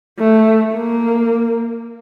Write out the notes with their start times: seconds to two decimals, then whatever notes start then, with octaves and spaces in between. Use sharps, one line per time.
0.19 A3
0.74 A#3